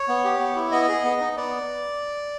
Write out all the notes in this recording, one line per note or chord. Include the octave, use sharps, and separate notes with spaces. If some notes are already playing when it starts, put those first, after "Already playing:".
Already playing: C#5
B3
G4
B3
E4
B3 D#5
G#4
B3
D#4
B3 D5